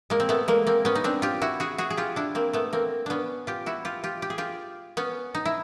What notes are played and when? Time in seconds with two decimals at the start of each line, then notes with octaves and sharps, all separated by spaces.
0.10 G#3 A#3
0.20 C4
0.29 A3 B3
0.48 G#3 A#3
0.67 A#3 C4
0.85 B3 C#4
0.95 D#4
1.04 C4 D4
1.22 F4 G4
1.42 E4 F#4
1.60 F#4 G#4
1.78 F#4 G#4
1.90 G#4
1.97 F4 G4
2.16 D4 E4
2.35 A#3 C4
2.53 A3 B3
2.73 A#3 C4
3.06 B3 C#4 D4
3.47 F4 G4
3.66 E4 F#4
3.85 F4 G4
4.04 F4 G4
4.22 G4
4.30 G#4
4.38 F4 G4
4.97 B3 C#4
5.35 D#4
5.45 E4